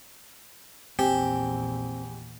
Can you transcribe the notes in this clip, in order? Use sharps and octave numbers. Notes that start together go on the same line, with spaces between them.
A#1 E2 C4 G4 G#5